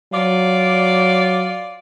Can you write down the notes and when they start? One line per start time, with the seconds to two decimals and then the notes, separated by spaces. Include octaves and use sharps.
0.13 F#3 F4 D5